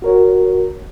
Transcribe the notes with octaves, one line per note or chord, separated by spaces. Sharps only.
F#4 A#4 C#5